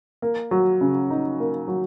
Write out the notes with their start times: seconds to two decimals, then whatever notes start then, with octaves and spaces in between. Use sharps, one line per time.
0.22 A#3
0.51 F#3
0.81 C#3
1.10 D#4
1.40 A#3
1.68 F#3